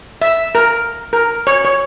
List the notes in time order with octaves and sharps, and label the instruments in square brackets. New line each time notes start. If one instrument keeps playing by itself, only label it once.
[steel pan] E5
A#4
A#4
C#5
C#5